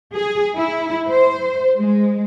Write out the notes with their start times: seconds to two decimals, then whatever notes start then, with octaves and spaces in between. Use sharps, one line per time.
0.15 G#4
0.57 E4
1.09 C5
1.77 G#3